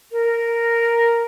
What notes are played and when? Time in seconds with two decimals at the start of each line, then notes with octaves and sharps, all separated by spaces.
0.12 A#4